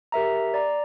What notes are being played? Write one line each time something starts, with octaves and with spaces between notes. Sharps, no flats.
G4 A#4 E5 A#5
D5 A#5